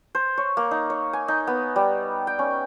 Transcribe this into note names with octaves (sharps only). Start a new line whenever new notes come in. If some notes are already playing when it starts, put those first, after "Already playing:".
C5
C#5
A#3
D#4
C#5
G#5
D#4
B3
G3
G5
C#4